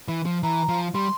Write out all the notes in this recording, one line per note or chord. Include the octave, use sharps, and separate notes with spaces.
E3
F3
E3 A#5
F3
G3 C6